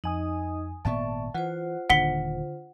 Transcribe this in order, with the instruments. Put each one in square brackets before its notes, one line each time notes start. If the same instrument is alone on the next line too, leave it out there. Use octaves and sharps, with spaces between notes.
[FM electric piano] F2 G#5 D#6 [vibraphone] D#4 D#5
[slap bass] G#1 A#2 B3 [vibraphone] D5 E5 C#6 [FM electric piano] A5
[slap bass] E3 [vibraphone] F4 C5 [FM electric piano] F#5
[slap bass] D#1 D#2 [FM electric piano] D3 [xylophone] F#5 B6 G7